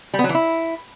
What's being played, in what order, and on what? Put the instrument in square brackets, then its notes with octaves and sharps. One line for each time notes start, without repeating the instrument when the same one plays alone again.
[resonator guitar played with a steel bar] G3
B3
F#3
E3
E4